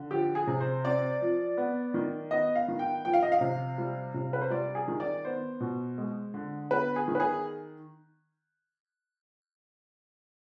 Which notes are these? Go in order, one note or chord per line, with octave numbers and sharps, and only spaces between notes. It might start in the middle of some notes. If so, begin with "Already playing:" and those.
Already playing: D3
F3 G4
G#4
C3
C5
C4 D5
F3
B3
D#3
B3 D#5
F5
D#3
G5
F3 G5
F5
D#5
F5
C3
G3
C3
B4
C5
G3 D5
G#4
D#3
D5
B3 C5
B2
G#3
D3
B3 B4
G#4
D#3
B4
G#4